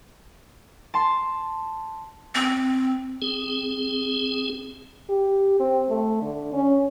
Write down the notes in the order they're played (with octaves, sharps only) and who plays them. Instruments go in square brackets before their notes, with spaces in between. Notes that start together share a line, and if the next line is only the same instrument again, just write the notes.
[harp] A5 C6
[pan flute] C4
[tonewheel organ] C4 G#4
[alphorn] G4
C4
A3
D3
C#4